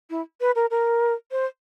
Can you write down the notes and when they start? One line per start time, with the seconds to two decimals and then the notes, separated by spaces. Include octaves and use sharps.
0.10 E4
0.41 B4
0.55 A#4
0.71 A#4
1.32 C5